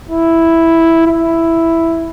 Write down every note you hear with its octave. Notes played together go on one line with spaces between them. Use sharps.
E4
E4